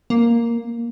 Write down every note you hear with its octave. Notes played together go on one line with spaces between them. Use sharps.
A#3